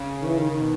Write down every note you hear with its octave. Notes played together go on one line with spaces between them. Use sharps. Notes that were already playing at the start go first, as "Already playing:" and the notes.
Already playing: C#3
D#3
E3
D#3
D#3
B2